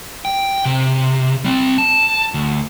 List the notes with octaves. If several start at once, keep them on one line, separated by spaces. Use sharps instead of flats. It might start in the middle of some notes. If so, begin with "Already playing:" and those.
G5
C3
G3 C4
A5
D2